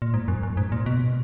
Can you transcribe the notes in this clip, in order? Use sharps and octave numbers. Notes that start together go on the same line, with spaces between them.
A#2
G#2
F#2
F#2
G#2
A#2
B2